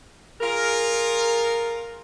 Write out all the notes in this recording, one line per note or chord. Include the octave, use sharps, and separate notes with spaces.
F4 G#4 A#4